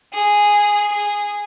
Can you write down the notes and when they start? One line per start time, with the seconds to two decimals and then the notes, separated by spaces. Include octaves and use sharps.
0.13 G#4
0.92 G#4